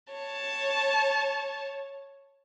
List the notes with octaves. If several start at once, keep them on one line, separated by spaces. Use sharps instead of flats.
C#5 A5